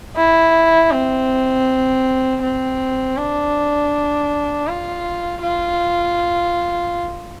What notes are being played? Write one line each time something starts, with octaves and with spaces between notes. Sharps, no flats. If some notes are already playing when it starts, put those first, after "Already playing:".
E4
C4
C4
D4
F4
F4